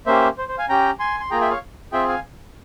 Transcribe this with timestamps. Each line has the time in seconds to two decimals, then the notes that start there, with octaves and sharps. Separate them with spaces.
0.06 A#3 C#4 G4 C5 E5
0.38 C5
0.48 C5
0.58 F5 G#5
0.69 C#4 G4 G5 A#5
1.00 G#5 C6
1.20 C6
1.30 A#3 F4 G#4 G5 A#5
1.41 E5 G5
1.51 C#5 F5
1.92 C4 F4 G#4 E5 G5
2.08 F5 G#5